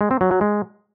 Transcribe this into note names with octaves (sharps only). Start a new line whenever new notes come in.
G#3
C4
F#3
F#3
G#3